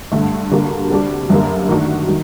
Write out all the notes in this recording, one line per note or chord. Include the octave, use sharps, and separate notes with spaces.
G2 D3 A3
D3 G3 A#3 F#4
C3 G3 D4 F#4
F#2 D3 G3 A#3
D#3 A3 D4 F#4
D#3 F#3